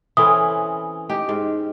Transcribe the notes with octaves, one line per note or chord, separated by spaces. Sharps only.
E3 C4 C#4 A4 D#6
D#4 G4
G#2